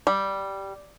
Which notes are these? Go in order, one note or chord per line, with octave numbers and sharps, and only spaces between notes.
G3